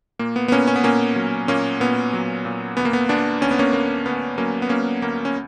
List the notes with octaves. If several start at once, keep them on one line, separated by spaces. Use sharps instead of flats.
A#2 A#3
B3
B3
A#2 A#3 C#4
C#4
B3
A#2 A#3 C#4
F#3
A#2 A#3 C#4
A#2 B3
F#3
A#2
D2 B3
A#3
B3
D2 B3 D4
D2 C#4
B3
A#3 C#4
D2 A#3
D2 B3
F#3 A#3 C#4
B3
F#3 A#3 C#4
D2 A#3
C#4